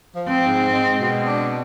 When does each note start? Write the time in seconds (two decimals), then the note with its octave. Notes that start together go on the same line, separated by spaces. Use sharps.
0.14 F3
0.28 C4
0.42 G#2
0.71 G#3
0.98 B2
1.26 D4